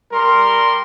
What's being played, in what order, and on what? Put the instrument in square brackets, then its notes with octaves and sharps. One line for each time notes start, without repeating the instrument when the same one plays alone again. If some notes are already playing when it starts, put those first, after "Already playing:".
[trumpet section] G3 A#4 C6